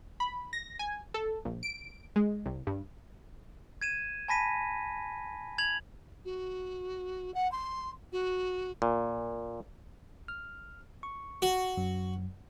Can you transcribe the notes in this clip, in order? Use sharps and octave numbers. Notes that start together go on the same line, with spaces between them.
B5
A#6
G#5
A4
A#1
D7
G#3
C2
G2
G#6 D#7 E7
G#5 A5 B5 A#6 B6 D#7
G#6 F7 F#7
F#4
F#5
C6
F#4
A#2
F6
C#6
F#4
F#2 F#3